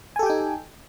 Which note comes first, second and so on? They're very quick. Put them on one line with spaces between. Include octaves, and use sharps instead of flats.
G#5 A4 G4 G5 D#4